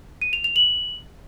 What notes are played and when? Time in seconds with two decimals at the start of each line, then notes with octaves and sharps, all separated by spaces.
0.22 D#7
0.33 F7
0.44 F7
0.56 F#7